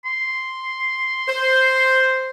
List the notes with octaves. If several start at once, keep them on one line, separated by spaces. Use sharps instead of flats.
C6
C5